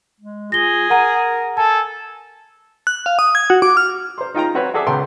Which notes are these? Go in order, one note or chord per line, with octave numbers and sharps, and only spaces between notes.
G#3
F4 G#4 A#6 G7
A#4 F#5 A#5 D#7
A4 G#5 A5
F#6
F5
D#6
G#6
F#4
D6
F6
C5 C6
D#4 F4 G5 A#5
C4 F#4 B4 C#5 E5
F#4 G#4 A4 D5 E5
C#2 B3 A4 G5 C6